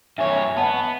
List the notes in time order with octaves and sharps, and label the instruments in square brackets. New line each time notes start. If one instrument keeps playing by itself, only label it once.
[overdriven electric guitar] G2 C#5 [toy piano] E5 G#5
[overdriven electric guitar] B3 [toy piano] D#5 F#5 A5